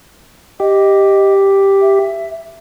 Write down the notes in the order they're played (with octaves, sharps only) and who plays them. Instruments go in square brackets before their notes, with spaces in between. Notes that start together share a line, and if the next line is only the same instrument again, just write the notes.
[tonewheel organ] G4 [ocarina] D#5
[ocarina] E5